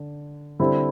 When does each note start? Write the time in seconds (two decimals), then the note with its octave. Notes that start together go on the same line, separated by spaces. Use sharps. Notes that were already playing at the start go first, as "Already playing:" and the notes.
Already playing: D3
0.60 D3 G3 C4 E4